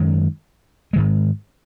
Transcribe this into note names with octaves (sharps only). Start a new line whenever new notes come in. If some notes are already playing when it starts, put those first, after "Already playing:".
Already playing: F#2 D#3 G#3 C#4
G#2 D#3 G#3